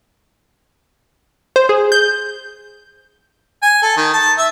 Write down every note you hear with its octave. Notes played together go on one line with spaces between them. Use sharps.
C5
G#4
G6
G#5
A4
D#3
A5
E5